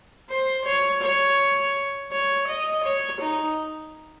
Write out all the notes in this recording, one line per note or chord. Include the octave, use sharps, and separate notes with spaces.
C5
C#5
C#5
C#5
D#5
C#5
D#4